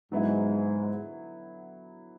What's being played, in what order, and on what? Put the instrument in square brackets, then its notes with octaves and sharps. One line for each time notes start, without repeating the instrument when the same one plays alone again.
[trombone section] G#2 [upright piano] D3 F#3 B3 E4